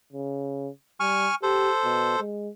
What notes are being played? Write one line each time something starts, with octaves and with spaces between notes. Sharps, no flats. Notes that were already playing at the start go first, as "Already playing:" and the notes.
C#3
G3 G#5 C#6 F6
G4 A4 C5
B2
G#3